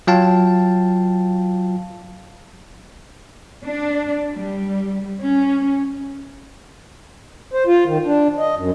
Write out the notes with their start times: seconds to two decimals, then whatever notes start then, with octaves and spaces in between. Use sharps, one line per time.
0.07 F#3 F4 F5 G5 A5
3.64 D4
4.35 G3
5.22 C#4
7.54 C5
7.67 F4
7.86 D#3
8.05 D4
8.38 D#5
8.56 F#2